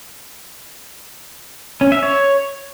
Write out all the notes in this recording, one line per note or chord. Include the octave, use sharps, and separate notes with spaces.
C#4
E5
C#5